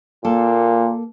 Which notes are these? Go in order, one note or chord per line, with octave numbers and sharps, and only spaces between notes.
A#2 A#3 A4